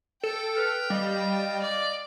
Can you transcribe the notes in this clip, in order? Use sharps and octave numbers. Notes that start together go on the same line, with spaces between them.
A4 G5
B4 F6
G3 D#5 F5
D5